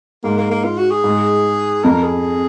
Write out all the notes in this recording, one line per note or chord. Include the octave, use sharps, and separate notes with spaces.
G#2 A#3
A#3
A#3
F4
F#4
G#4
G#2
F2 A#4
G#4